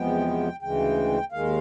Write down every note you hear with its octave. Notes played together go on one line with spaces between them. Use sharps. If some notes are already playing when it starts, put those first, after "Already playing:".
Already playing: E2 C3 F3 G#3 B3 G5
D2 C#3 E3 G#3 G5
D#2 D#3 G#3 F5